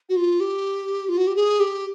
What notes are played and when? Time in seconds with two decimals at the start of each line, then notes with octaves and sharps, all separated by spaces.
0.09 F#4
0.16 F4
0.40 G4
1.09 F4
1.18 F#4
1.27 G4
1.36 G#4
1.60 G4